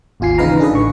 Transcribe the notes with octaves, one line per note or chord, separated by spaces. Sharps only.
G#1 D#2 F4 G#5 C7
C#3 E3 D#4 B4 F5 A#5
D4 G#4 A4 B4 D#5
A1 D3 C#6